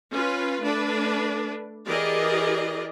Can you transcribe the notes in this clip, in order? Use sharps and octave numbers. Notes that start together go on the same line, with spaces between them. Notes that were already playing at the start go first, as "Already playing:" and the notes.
C#4 F4 B4
A3 D4 B4
E3 G4 G#4 A#4 D5 D#5